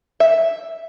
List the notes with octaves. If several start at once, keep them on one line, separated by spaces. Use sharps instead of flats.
E5